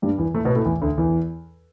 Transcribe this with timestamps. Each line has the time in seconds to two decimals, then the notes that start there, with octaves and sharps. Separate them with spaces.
0.02 G2 G3
0.18 E2 E3
0.34 A2 A3
0.45 B2 B3
0.56 A2 A3
0.65 E2 E3
0.82 D2 D3
0.97 E2 E3